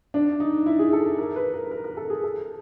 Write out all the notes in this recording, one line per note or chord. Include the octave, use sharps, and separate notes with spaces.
D4
D#4
E4
G#4
A4
A#4
B4
A#4
A#4
A#4
A4
G#4
A4